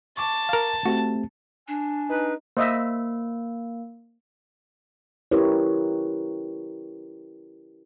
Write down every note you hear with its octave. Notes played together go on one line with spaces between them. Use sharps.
A5 C#6 D6
A#4 F5
A3 C4 F#4 G4
D4 G#5
D#4 B4
A#3 C5 D#5 E5
C#4 E4 G4 A#4 B4 C#5